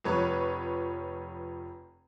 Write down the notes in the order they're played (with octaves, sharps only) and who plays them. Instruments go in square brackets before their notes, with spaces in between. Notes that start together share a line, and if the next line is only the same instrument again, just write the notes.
[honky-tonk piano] F1 F3 B4 C#5 C#6